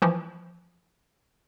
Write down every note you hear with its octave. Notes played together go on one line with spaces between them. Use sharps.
E3 F3